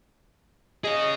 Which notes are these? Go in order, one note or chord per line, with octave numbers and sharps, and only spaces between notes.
G#4 C#5 D#5